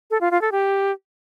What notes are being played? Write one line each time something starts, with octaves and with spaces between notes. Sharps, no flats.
A4
F4
F4
A4
G4